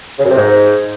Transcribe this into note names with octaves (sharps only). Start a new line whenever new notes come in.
C#3
F#2
C3
G#2